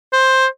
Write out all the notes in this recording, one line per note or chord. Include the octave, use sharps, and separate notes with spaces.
C5